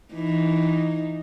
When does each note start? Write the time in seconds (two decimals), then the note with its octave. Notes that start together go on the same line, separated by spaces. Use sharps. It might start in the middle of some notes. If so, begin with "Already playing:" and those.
0.13 E3 D#4